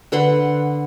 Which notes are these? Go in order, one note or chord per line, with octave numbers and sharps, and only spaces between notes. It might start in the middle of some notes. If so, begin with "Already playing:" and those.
D3 B4 F#5 C6